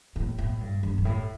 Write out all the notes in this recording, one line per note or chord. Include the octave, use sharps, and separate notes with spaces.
A2
A2
G2
G2
G2
A2